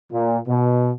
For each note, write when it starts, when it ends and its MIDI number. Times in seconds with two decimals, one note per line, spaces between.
0.12 0.38 46
0.47 0.91 47